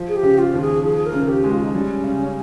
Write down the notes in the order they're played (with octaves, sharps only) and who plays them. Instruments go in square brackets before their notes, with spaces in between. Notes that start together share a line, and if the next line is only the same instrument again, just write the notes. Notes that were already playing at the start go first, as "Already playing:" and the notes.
Already playing: [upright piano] F3
[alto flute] G#4
G4
[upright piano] C#3
[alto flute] F4
[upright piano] D#2
[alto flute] G#4
[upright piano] F3 [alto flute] G#4
[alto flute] A#4
[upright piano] C#3
[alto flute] G4
[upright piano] G#3
[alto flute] F4
D#4
[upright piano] G3 [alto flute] C#4
[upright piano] C#3